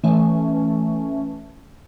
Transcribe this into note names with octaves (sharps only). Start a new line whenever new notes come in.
E3 A3 C#4